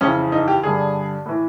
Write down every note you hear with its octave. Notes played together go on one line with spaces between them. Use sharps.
F2 C#3 E3 C#4
D#4
G4
G2 D3 G#4
A2 E3